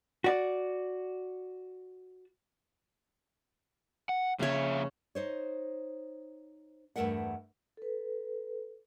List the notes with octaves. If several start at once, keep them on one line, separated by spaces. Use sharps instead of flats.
F#4 D5
F#5
F2 C#3 A#3 C#5 E5
D#4 C5 C#5
E2 G2 A3 A#4 E5 F#5
A4 B4